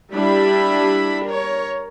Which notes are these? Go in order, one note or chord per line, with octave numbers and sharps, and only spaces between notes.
G3 D4 E4 B5
A#4 C#5